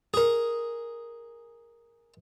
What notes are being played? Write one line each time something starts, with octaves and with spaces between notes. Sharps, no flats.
G#4 A#4